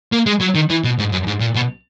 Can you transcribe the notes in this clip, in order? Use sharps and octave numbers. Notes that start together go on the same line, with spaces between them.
A#3
G#3
F#3
D#3
E3
B2
G#2
F#2
G#2
A#2
B2